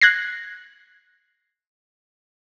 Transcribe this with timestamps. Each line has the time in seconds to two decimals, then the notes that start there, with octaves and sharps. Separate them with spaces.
0.01 F#6 G#6 A#6 C7